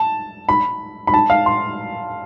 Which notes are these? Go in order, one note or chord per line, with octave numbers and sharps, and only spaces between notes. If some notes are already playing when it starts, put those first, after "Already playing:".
Already playing: A5
B5
B5
A5
F5
C6